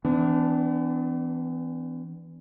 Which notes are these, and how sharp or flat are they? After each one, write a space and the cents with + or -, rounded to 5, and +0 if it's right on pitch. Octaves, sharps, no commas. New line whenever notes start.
E3 +0 B3 +45 D4 -5